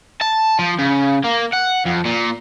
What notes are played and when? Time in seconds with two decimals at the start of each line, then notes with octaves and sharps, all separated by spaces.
0.21 A5
0.59 F3
0.79 C#3
1.24 A#3
1.53 F#5
1.86 F2
2.05 A#2